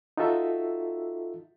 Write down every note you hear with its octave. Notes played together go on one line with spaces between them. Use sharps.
D#4 F4 F#4 A4 E5